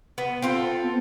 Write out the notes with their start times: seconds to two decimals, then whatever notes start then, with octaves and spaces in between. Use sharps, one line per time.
0.18 B3
0.42 C4 F4 A4
0.84 B3